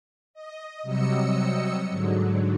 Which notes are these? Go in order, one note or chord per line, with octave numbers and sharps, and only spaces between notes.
D#5
C3 F#3 G3 D#5 E6 C#7
G#2 D3 F#3